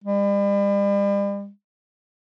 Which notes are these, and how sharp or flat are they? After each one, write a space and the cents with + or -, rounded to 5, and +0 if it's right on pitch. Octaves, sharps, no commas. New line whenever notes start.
G3 +40